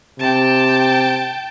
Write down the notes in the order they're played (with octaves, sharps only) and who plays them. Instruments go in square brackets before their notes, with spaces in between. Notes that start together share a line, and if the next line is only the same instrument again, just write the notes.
[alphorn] C3 [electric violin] G5 A5